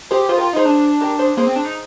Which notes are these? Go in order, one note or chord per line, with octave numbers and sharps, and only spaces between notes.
G4 G#4 C5
F4 G#4 C5
G4 A#4
F4
D#4 G#4 C5
D4
G4 A#4
G#4 C5
A#3 G#4 C5
C4
D4
D#4